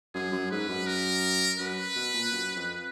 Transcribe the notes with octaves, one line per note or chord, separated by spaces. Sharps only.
F#2 G#4
F#2
G#2 B4
F#2
A#4
F#2 B4
B2
A#2
F#2
F2